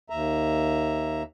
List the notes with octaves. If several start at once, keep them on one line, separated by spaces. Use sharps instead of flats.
D#2 E5 A#5